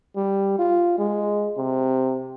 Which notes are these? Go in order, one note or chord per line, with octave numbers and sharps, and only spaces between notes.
G3
F4
G#3
C3